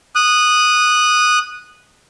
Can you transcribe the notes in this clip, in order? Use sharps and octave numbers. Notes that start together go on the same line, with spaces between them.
D#6 F#6